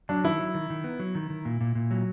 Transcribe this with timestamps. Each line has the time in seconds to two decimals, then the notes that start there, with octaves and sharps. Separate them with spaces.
0.09 F#3 D4
0.24 D#3 E4
0.39 F#3
0.55 D#3
0.70 D#3
0.84 B3
0.99 F#3
1.15 D#3
1.30 D#3
1.45 A#2
1.61 A#2
1.75 A#2
1.91 F#3